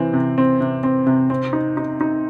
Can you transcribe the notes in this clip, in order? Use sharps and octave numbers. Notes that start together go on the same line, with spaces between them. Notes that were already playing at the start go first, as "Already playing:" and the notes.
Already playing: C3 E3 C4
C3
C4
C3
C4
C3
C4
D#4
D#4
D#4